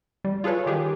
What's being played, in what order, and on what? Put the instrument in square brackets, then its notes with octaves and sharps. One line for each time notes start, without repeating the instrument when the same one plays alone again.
[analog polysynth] G3
F4 G#4 A4 B4 C#5
D#3 G4 G#4